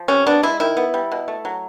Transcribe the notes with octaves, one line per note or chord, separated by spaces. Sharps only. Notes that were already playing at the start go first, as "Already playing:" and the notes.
Already playing: F3
C3 C#4
B3 D4
G#3 E4
D#3 E4
B3
G3
B2
A3
F#3